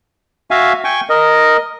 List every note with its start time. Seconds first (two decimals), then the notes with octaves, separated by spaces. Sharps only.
0.51 F#4 E5 F5 G#5
0.84 G5 G#5 C#6
1.10 A#4 D#5